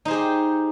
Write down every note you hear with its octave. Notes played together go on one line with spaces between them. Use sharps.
D#4 G4 G#4 C5